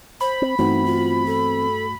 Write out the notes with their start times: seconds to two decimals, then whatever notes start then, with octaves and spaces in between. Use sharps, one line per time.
0.21 C5 B5
0.42 C4
0.59 G2 E3 A3 B3 C4 D#4 F#4
0.86 F4
1.26 A4